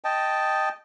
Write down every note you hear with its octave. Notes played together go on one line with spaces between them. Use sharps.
D#5 G5 A5